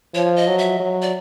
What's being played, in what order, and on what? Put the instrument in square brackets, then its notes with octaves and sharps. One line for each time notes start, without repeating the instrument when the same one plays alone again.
[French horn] F3 [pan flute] C#5
[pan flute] D#5
[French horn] F#3
[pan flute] E5
[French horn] F#3
[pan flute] D5